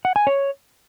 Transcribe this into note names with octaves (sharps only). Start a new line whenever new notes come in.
F#5
G#5
C#5